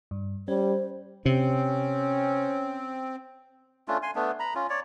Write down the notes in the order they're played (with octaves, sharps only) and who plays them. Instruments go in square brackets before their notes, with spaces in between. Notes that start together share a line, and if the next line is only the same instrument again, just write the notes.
[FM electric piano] G2
[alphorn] G3 [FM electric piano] C#4 [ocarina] C5
[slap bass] C3 [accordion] C4 [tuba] C#4
[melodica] A3 C#4 D4 F4
G#5 C6
A3 B3 D4
A#5 B5
C#4 F4
C#5 D5